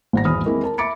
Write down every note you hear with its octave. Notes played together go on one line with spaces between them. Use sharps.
G#1 F#5 A#6
G#1 E2 B5 D#6 F6
G#3 A#3 C4 E4
A#4 A5
E5 B5 D6 A6 C#7 D7